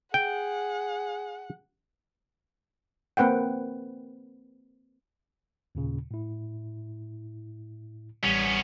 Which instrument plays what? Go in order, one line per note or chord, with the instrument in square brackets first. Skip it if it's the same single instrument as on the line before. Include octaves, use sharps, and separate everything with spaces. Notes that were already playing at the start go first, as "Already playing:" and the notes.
[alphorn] G#4 [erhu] F#5 [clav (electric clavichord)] G5
[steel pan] A#3 C4 B4 F#5 G5
[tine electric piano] D#2 A#2 C#3
A2 E4
[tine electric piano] A1 G3 [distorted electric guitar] B3 C#4